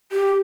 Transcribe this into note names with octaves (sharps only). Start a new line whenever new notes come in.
G4